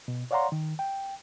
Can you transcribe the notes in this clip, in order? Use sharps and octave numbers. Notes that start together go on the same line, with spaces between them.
B2
C#5 D5 F5 F#5 A#5 C6
D#3
G5